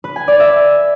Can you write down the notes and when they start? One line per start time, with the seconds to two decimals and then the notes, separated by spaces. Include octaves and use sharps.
0.04 B4
0.16 G#5
0.28 D5
0.40 E5